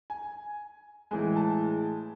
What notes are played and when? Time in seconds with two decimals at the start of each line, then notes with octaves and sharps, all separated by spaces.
0.10 G#5
1.11 A2 E3 G#3 G#5
1.36 A5